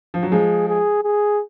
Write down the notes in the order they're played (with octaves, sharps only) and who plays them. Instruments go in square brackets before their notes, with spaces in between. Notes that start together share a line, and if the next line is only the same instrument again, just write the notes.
[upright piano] F3
F#3
[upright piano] F3 G#3 [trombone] G#4
[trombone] G#4
G#4